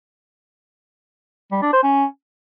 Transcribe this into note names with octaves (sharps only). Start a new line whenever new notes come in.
G3
D4
C5
C#4